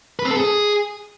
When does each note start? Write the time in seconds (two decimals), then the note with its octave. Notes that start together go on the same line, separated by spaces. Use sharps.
0.19 B4
0.25 C4
0.31 A4
0.37 G#4